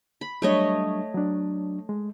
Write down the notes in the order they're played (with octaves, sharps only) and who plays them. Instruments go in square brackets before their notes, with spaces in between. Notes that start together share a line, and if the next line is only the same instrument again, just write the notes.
[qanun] B5
[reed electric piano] F#3 G3 D4 [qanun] A3 C#5 D#5
[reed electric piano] F#3 D4
G#3